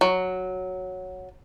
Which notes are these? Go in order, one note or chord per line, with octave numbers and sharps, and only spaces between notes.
F#3